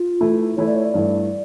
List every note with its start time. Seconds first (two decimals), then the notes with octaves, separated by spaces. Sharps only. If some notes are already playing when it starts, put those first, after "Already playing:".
Already playing: F4
0.21 E3 A3 E4
0.57 E3 A3 E4 C#5
0.67 D5
0.76 C#5
0.85 D5
0.94 G2 E3 A3